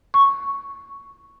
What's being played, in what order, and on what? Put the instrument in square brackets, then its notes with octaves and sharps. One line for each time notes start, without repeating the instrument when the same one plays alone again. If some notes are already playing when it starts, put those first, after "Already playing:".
[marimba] C#6